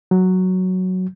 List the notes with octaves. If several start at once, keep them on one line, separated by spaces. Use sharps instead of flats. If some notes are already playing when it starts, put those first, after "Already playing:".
F#3